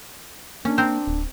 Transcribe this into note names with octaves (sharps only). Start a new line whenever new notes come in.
A#3 C#4 D4
C4 A#4 C5
D1